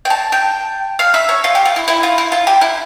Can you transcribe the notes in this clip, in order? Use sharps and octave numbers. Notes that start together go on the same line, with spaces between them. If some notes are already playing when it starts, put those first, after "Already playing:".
G5
A5
G5
F5
E5
C#5
F4
G4
F4
E4
E4
F4
E4
F4
G4
E4